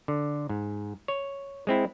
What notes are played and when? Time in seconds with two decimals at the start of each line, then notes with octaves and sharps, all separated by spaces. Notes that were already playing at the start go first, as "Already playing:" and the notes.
0.08 D3
0.49 G#2
1.08 C#5
1.67 G#3 C4 E4